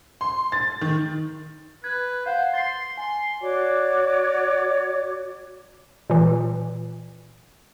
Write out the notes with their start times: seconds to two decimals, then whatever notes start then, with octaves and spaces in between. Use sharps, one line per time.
0.21 C6
0.52 A6
0.81 D#3
1.84 B4 G#6
2.26 C5 F5 F#5
2.54 C6 A6 C7
2.98 G#5 C6
3.42 F#4 C#5 D5 D6
6.10 A#2 E3